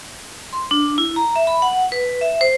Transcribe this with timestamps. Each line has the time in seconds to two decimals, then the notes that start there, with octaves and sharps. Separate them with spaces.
0.53 C6
0.71 D4
0.98 E4
1.16 A#5
1.36 E5
1.47 B5
1.62 F#5
1.92 B4
2.21 E5
2.41 C5